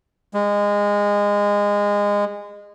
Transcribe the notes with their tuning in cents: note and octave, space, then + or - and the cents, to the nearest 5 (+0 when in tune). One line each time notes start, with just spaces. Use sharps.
G#3 -20